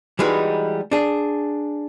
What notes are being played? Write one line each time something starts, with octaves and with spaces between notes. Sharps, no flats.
E3 G3 G#3 D#4 F#4 B4
D4 G#4